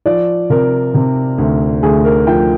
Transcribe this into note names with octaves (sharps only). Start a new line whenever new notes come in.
F3 D5
C3 A#4
C3
D2
D2 G#4
A#4
F3 G5